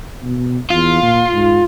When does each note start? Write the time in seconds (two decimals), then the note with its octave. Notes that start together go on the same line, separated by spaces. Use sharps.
0.22 B2
0.71 E2 F4
1.02 A#2
1.34 G#2